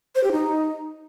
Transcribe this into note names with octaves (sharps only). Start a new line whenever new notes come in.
C5
G4
D#4